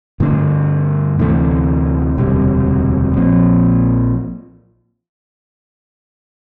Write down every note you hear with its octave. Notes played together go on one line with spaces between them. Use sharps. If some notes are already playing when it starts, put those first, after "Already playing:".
G2 D3 A3 D4
D2 C3 E3 A3
E1 D2 C3 G3
A#1 A#2 F3 C4